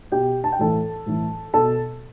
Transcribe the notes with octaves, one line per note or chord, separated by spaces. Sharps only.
B2 G4 G5
A5
G5
A2 E3 A4 A5
A2 E3
B2 A4 A5